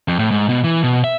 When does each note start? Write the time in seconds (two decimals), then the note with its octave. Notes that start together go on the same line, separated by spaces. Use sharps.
0.08 F2
0.19 A2
0.31 G#2
0.49 B2
0.64 E3
0.83 B2
1.04 E5